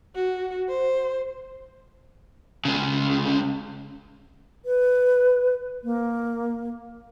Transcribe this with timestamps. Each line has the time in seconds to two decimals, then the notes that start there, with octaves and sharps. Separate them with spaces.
0.15 F#4
0.69 C5
2.65 C#2 C#3
4.65 B4
5.84 A#3